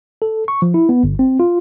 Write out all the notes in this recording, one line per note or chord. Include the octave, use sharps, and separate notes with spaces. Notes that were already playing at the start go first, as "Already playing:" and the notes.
A4
C#6
F3
E4
B3
G1
C4
F4